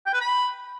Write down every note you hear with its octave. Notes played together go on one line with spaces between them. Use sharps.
G5
B4
B5